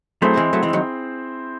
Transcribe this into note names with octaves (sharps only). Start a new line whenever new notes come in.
F#3 A3 C4 E4 G#4 C5
E3 G#3
F#3 A3
E3 G#3
D#3 F#3